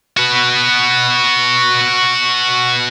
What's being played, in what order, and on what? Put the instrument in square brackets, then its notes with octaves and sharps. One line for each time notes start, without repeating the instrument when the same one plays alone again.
[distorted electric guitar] F#4 B4